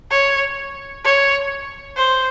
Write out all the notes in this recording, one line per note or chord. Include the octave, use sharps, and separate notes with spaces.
C#5
C#5
C5